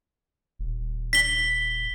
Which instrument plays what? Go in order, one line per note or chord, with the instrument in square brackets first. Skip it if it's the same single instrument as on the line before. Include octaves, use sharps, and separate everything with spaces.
[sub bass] D#1
[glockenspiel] B6 G7